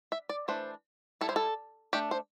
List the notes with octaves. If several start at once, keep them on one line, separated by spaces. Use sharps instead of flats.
E5
D5
E3 A3 D4 C5
G3 E4 A4
C5
A4
A3 D4 G4
C5